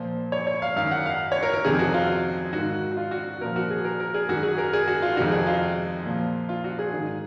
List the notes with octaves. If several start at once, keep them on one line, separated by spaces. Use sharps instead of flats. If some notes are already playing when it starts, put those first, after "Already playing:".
Already playing: A#2 F3 C5
C#5
C#5
F5
F#2 D#3 F5
F#5
F5
C#5
A#4
A#4
F2 C3 D#3 G#4
F#4
F4
G#2 D#3 F#4
F#4
F4
F#4
A#2 F3 A#4
F#4
G#4
A#4
A#4
G#4
F#2 D#3 F#4
G#4
A#4
G#4
F#4
F4
F2 C3 D#3 F#4
G#4
F4
A#2 F3
F4
F#4
G#4
G#2 D#3